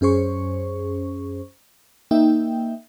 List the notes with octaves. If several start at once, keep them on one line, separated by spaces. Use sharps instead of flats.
F#2 C#4 G#4 C5 C#6
A#3 D#4 E5 G5